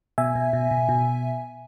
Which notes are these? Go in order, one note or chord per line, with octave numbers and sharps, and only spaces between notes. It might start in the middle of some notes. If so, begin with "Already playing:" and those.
B2 E5 G#5
B2
B2
B2
B2